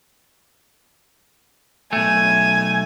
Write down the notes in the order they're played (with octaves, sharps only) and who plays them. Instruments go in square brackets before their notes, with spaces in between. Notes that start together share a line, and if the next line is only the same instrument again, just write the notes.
[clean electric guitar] B1 A3 [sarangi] G#5